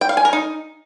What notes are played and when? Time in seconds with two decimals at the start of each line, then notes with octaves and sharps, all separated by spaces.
0.01 G5
0.09 F5
0.17 G#5
0.25 A#4
0.33 D#4